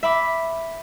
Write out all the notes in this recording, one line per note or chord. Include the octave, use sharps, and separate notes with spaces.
E5 B5 D6